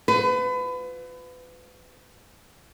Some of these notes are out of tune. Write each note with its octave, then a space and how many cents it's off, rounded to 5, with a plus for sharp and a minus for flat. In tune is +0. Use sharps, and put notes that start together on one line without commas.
F4 +25 B4 +30